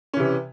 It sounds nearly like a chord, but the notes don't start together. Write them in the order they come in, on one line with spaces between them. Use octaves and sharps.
C#4 E3 C3